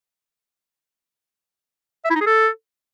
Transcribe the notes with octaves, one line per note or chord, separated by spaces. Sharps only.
E5
E4
D#4
G#4
A4